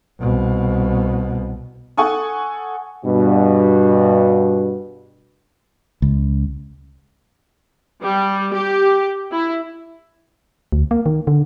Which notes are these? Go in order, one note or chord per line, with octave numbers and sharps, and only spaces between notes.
C2 B2
A4 F#5 G#5 C#6 D#6
G2 B2
C#2
G3
G4
E4
D2
A#3
D#3
D3